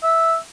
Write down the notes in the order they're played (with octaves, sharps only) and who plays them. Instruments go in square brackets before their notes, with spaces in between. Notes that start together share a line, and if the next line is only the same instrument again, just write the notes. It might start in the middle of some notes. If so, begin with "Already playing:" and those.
[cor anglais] E5